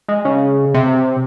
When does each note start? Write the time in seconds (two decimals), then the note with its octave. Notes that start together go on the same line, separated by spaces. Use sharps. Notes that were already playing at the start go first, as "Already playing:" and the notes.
0.09 G#3
0.25 C#3
0.74 C3